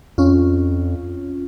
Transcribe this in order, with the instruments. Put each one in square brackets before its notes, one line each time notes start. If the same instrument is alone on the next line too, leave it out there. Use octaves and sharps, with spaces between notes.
[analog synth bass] F2 [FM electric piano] C#4 F4